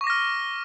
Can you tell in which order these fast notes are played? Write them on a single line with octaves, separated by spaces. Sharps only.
C#6 D6 A#6 F6